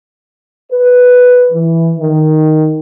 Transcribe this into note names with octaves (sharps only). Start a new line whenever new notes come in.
B4
E3
D#3